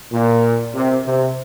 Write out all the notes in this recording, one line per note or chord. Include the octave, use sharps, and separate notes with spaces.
A#2
C3
C3